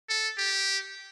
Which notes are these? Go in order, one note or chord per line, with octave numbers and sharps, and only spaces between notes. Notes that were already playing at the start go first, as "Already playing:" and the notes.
A4
G4